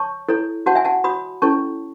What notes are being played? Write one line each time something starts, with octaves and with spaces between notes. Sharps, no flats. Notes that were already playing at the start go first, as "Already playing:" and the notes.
Already playing: C#5 A5 C#6
E4 A4 C#5
F#4 C#5 F#5 A5
E5 G#5
F#5 A5
F#4 C#5 B5 D#6
C#4 E4 A4 C#5 A5 C#6